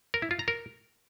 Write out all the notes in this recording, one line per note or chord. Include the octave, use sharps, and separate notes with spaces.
A#4
E4
F4
A#5
A#4